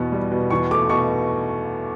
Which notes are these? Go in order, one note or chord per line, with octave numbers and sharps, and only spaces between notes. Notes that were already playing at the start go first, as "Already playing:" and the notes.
Already playing: E2 B2 B3
G3
B2
E2 C#6
A3 D6
B2 C#6